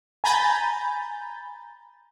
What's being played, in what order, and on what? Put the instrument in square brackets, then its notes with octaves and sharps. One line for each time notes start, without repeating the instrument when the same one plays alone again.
[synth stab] G#5 A#5 B5 G6 A6